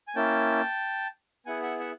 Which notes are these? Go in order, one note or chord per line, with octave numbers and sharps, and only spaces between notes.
G#5
A#3 C#4 E4 G5 A5
B3 E4 G#4 F#5 G#5
E5 F#5
E5 F#5